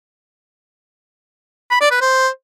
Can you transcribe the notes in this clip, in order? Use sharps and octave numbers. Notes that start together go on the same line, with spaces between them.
B5
D5
B4
C5